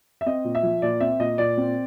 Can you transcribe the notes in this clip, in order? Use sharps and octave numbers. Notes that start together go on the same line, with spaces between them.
E5
C4 D#5
A#2
E5
F3
A#2 D5
C4 E5
A#2 D#5
A#2 D5
C4